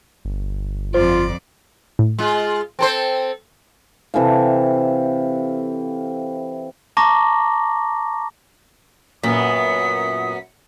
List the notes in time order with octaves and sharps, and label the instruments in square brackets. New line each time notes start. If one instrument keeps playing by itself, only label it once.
[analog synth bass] G1
[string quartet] F2 D5 [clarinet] F4 [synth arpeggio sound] C5 C6
[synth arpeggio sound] A2
[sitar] G#3 F4
C4 A4 C5
[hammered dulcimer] C3 E3 A4 F5
[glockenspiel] A5 A#5 C#6 D6 A#6
[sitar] F#2 B3 [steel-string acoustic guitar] A#2 [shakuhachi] D#6 [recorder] B6